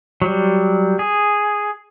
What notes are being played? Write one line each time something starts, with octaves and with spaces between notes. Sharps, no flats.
F#3 G3
G#4